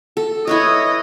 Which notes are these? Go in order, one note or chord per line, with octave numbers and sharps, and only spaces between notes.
A4
E4 B4 C#5 D#5